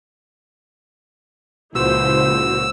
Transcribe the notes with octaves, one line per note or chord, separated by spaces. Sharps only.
C#2 A#2 C#3 F3 E4 F#4 C5 E6